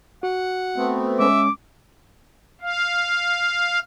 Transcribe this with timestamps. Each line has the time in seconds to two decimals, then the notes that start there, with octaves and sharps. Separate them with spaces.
0.23 F#4 F#5
0.77 A3 B3 C4
1.19 G#3 C#4 E5 D6
2.62 F5